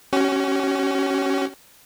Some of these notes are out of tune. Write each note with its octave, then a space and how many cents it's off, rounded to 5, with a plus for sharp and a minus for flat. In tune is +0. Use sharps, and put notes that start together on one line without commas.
C#4 +0 F#4 +45